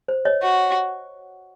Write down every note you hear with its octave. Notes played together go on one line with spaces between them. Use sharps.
C5
C#5 D#5
F#4